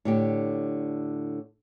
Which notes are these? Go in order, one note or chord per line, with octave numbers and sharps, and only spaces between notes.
A2 D3 G4